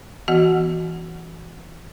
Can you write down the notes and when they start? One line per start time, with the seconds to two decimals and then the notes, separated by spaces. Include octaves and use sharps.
0.28 E3 B3 F#4 D#5 F#5